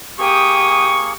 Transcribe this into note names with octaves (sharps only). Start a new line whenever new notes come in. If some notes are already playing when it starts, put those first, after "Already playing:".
A#3 G4 G#4 G5 C#6 D#6